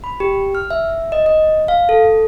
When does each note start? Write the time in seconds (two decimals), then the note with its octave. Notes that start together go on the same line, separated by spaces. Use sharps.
0.04 B5
0.20 G4
0.55 F6
0.71 E5
1.12 D#5
1.26 D#5
1.68 F5
1.89 A4